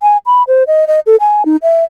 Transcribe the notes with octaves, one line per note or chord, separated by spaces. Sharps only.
G#5
B5
C5
D#5
D#5
A4
G#5
D#4
E5